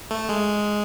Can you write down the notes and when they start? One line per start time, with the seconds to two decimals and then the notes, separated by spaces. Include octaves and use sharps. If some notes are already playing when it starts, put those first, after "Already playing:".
0.11 A3
0.29 G#3